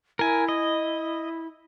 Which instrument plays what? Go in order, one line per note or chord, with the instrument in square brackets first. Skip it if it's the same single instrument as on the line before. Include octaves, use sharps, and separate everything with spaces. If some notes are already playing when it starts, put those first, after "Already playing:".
[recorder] E4 [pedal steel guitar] A#4 G#5
[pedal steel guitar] D#5